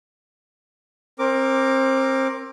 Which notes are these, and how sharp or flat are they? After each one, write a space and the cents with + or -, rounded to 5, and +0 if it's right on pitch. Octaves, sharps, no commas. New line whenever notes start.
C4 +30 A#4 +0 D6 +0